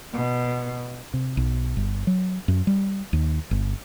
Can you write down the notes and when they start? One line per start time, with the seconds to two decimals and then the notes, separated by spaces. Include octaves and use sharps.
0.15 B2
1.14 C3
1.37 B1
1.77 G1
2.07 F#3
2.48 F#2
2.67 G3
3.13 D#2
3.51 G1